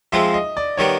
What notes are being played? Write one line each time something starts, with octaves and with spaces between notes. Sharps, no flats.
F3 G#3 C4 E5
D#5
D5
D#3 G3 B3 C#5